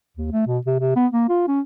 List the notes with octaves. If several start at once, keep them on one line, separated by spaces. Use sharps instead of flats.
D#2
A3
B2
C3
C3
B3
A#3
F4
C#4